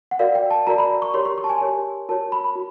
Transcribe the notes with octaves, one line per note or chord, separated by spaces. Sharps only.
F#5
F#4 A#4 D5 F5
G5
A5
F#4 A#4 D5 A#5
B5
C#6
G4 A#4 C#5 C6
C6
C#6
A5
G#5
G4 A#4 C#5
F#4 A#4 C#5 A5
B5
B5
F#4